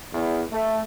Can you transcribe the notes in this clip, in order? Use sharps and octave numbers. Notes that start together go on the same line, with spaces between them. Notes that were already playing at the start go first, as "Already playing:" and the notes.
E2
A3